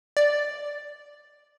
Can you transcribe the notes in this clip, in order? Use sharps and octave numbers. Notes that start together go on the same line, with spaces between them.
D5